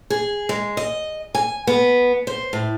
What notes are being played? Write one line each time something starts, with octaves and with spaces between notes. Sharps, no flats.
G#4
G#3
D#5
G#5
B3
C5
A2